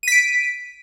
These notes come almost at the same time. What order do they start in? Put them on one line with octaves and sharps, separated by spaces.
D#7 B6 D7